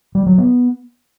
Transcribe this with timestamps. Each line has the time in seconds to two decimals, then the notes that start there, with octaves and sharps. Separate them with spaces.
0.15 G3
0.26 F#3
0.38 B3